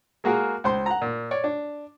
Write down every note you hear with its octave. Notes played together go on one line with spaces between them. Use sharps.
G#3 A#3 F#4 G#4 A#4
C#2 C5 C6
F#5 A#5
A#2
C#5 D5
D4